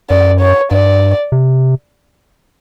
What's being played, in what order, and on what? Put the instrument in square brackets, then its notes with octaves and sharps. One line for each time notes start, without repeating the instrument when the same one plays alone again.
[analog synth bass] F#2 [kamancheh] D5
[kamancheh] C#5
[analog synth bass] G2 [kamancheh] D5
[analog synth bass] C3